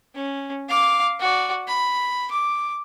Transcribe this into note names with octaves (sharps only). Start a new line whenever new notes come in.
C#4
F5 D6
F#4 D5
B5
D6